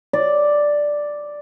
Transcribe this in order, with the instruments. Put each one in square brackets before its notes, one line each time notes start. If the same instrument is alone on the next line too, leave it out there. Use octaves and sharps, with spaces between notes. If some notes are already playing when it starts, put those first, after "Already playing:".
[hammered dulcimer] D5